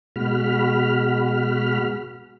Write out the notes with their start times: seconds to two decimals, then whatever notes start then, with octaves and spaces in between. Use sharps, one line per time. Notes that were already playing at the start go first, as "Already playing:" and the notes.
0.16 B2 G#3 F#4 B5 F6